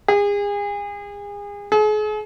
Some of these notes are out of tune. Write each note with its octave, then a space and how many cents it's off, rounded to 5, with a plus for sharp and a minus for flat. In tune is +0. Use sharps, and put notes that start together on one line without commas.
G#4 -35
G#4 +40